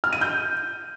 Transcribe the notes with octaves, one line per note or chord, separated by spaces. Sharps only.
F6
D#7
G6